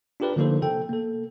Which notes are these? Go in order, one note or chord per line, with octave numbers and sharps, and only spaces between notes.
D4 F4 G4 A#4 B4 D5
D3 F3 A#3 D#4 A4 C5
C3 A4 G5
A#3 A4